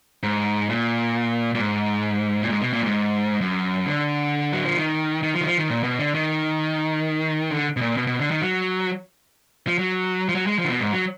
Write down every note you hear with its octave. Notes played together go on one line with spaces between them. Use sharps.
G#2
A#2
A#2
G#2
A#2
G#2
B2
A#2
F#2
G#2
F#2
D3
F#3
F3
D#3
D#3
F3
D#3
F3
D#3
A#2
B2
D3
D#3
D3
B2
A#2
B2
B2
D3
D#3
F#3
F3
F#3
F3
F#3
G#3
F3
D3
B2
G#2
F#3